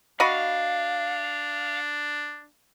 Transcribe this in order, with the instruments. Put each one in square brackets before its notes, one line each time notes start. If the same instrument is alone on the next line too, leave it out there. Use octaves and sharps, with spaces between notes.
[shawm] D4 [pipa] F#4 D#5 B5 [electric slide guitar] F5